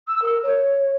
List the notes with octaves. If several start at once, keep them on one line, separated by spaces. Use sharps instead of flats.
E6
A#4
C#5